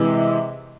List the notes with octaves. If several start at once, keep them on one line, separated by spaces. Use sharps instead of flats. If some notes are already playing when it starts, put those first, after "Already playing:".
Already playing: C3 E3 G#3